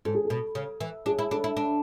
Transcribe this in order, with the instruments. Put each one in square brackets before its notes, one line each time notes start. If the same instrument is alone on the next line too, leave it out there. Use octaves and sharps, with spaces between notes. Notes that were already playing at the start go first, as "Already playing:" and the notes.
[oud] G#2 [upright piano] A4
[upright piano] G#4
A4
[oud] B2
C#3
E3
[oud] D4 [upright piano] G#4
[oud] E4
[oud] D4 [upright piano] A4
[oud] E4
D4